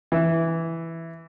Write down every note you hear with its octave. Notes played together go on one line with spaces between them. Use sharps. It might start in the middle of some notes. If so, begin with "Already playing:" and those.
E3